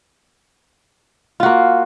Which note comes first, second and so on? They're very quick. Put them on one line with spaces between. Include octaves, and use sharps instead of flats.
F4 F#4 A#3